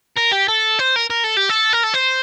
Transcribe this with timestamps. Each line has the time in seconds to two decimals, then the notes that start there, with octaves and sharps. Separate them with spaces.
0.17 A#4
0.32 G4
0.48 A4
0.79 C5
0.96 A#4
1.10 A#4
1.24 A4
1.37 G4
1.49 A4
1.73 A#4
1.84 A4
1.94 C5